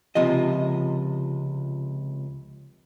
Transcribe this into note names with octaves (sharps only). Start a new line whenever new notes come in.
C#2 C3 F3 D#5